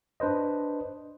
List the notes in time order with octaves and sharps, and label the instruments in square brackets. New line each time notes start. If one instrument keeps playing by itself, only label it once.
[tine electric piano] D4 B4 C5 D#5